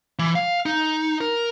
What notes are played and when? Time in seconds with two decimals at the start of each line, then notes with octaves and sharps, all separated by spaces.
0.19 E3
0.35 F5
0.66 D#4
1.21 A#4